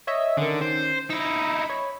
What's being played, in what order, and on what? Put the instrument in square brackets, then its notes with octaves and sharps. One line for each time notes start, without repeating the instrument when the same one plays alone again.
[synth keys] C#5 D#5 E5
[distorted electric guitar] D3 [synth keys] D#3 C#4
[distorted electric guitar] C5
[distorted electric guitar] D#4 E4 [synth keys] E6 A#6
[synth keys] C#5 B5